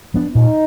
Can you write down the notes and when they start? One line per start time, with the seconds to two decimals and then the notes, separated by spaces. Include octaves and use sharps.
0.14 F3 B3 D4
0.35 A#2 D#4